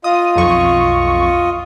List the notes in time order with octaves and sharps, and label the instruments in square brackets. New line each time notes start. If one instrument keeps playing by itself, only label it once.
[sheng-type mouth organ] F4 D#5 [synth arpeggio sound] D#6
[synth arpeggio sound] B1 F2 C#6